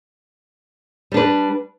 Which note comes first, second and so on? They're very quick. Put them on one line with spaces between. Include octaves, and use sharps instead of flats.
G3 D4 B4